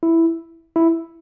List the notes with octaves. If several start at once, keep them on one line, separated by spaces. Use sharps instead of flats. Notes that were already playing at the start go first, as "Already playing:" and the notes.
E4
E4